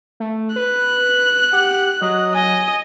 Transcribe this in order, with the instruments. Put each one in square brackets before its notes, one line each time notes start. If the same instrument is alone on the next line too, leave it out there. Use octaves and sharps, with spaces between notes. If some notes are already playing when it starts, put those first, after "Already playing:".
[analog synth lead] A3
[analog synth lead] B4 [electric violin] F#6
[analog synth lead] G4 [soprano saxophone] F#5
[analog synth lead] F#3 [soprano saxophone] D#5
[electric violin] D#5 [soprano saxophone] G#5